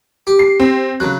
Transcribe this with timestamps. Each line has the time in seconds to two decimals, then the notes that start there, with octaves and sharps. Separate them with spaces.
0.27 G4
0.39 C7
0.60 C4
1.00 C#3 F#3 F#6